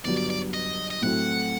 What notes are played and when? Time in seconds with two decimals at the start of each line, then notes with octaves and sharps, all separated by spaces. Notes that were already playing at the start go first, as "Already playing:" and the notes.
0.05 G1 G2 F#3 D5
0.17 D5
0.30 D5
0.54 D#5
0.90 D#5
1.02 A2 F#3 C4 F#4 A4 F#5